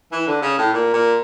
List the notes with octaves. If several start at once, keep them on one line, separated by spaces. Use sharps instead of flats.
E3
D3
C#3
A2
A#2
A#2